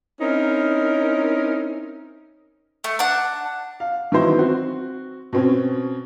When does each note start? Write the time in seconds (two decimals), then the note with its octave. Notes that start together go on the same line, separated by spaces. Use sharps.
0.21 C4 C#4 D#4 E4 A#4
2.84 A3
2.99 D4 F#5
3.80 F5
4.12 D#3 E3 F#3 B3 E4 C5
4.38 C4 F#4
5.33 B2 C4 C#4